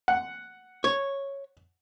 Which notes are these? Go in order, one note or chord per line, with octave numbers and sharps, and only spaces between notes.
F#5
C#5